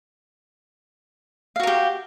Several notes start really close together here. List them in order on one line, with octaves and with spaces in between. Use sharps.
F5 F#4 A#4 G4